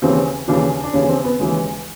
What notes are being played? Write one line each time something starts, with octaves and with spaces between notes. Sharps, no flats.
D#2 C#3 E3 C4
D#2 C#3 E3 D4
D4
D#2 C#3 E3 C#4
C4
B3
D#2 C#3 E3 G#3